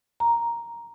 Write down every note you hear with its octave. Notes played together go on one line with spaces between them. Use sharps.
A#5